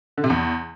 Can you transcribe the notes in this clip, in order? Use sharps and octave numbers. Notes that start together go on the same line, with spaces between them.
D3
C3
E2